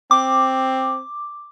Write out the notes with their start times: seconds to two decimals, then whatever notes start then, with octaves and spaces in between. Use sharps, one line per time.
0.11 C4 D6